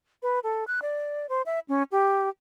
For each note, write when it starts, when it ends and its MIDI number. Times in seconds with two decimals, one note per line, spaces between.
0.22 0.39 71
0.43 0.64 69
0.67 0.79 90
0.82 1.26 74
1.29 1.42 72
1.46 1.59 76
1.68 1.83 61
1.92 2.29 67